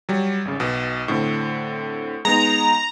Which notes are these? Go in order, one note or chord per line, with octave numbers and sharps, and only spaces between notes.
F#3 G3
G#1 C#3
B1 B2
A2 D3 C4
G#3 B3 D#4 A#5